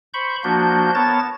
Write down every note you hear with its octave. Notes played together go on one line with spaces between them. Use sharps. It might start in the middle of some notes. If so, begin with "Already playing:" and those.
C5 B5 C#6 G6
F3 A#3 D4 F#4 G6
B3 A#4 C#5 A5 A6